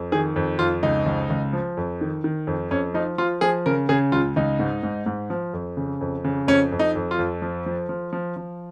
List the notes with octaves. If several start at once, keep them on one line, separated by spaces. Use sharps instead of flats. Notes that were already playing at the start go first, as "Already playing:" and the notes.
Already playing: F2
D#3 G#4
F2
F2 F4
C#2 D#4
C#2
C#2
F3
F2
D#3
D#3
F2
F2 C#4
F3 D#4
F3 F4
F3 G#4
C#3 A#4
C#3 G#4
C#2 F4
C#2 D#4
G#2
G#2
G#2
F3
F2
C#3
F2
C#3
F2 C#4
F2
D#4
F2
F4
F2
F3
F3
F3
F3
F3